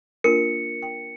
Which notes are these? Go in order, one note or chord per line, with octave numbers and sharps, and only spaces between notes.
A#3 D4 F4 A#4 C#7
G5